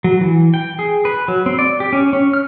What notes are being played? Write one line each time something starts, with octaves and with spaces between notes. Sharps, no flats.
F#3
E3
G5
G#4
B4
F#3
C4
D5
G4
C#4
C#4
F6